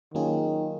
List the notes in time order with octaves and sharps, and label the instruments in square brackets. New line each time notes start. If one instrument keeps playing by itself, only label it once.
[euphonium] D#3 [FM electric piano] F#3 A#3 C#4 F4 G#4